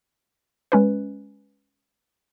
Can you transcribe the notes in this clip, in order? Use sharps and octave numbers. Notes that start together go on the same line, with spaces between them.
G#3 C#4 B4